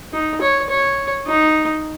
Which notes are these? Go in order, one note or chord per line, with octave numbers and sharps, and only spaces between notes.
D#4
C#5
C#5
D#4